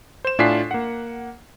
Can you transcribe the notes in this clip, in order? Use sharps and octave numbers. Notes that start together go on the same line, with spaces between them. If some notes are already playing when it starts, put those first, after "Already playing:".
C5 E7
A2 D4 F4 G#5 B6 C7
A#3 F#5